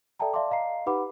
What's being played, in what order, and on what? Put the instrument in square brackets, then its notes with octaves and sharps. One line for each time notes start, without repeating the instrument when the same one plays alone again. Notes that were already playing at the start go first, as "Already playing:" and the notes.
[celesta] A4 D5 E5 G5 A5 A#5
D5 E5 F5 A5 C6 D6
D#5 F5 A#5 C7
D#4 G4 B4 F#5 B5 D6